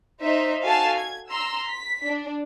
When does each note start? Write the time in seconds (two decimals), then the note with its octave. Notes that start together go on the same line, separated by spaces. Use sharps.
0.22 D#4 C5 E5
0.63 F#4 A4 F5 G#5 A5
0.99 G#6
1.30 A#5 C6 E6
1.69 B6
2.07 D4